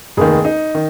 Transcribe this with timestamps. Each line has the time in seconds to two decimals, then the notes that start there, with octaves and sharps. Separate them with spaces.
0.17 F1 D#2 D#3 G#4
0.45 D#4
0.75 D#3